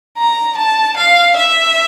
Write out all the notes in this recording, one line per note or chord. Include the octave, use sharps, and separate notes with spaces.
A#5
A5
F5
E5